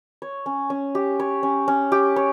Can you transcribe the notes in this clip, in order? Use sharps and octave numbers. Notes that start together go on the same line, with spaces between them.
C#5
C#4
C#4
G4
C#5
C#4
C#4
G4
C#5